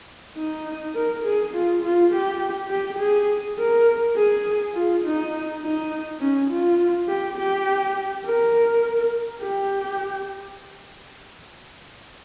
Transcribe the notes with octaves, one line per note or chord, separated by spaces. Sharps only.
D#4
A#4
G#4
F4
F4
G4
G4
G#4
A#4
G#4
F4
D#4
D#4
C#4
F4
G4
G4
A#4
G4